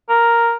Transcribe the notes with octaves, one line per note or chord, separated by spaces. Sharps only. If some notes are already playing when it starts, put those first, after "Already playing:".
A#4